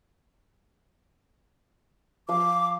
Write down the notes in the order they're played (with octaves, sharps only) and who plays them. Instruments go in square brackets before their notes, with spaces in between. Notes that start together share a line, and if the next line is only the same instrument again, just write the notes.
[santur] F3 F5 [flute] D6